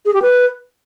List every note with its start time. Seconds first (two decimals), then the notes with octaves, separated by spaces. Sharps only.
0.05 G#4
0.14 G4
0.22 B4